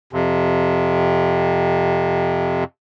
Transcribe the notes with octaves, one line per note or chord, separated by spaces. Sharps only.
F2 C3